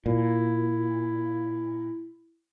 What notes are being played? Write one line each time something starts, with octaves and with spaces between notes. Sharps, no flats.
A#2 E4